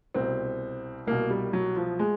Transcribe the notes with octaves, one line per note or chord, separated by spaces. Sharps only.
C2 B2 C4
C2 B2 A#3
G3
F#3
F3
G#3